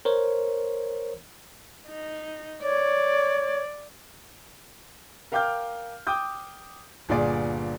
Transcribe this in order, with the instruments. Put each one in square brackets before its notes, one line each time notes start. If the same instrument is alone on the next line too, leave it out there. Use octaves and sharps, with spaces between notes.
[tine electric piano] A#4 C5 C#5
[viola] D#4
[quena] C#5 [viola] D5
[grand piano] A#4 F5 G5 D6 F6 G6
G5 D6 D#6 G6
G1 A#2 G#4 D5